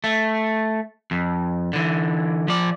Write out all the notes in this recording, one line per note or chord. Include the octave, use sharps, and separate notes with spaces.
A3
F2
D3 E3
F3 D5